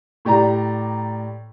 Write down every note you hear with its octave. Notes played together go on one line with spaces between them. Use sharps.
A2 G4 D5 A#5